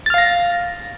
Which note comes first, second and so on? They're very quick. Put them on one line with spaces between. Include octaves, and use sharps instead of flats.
A6 F6 F5 A#6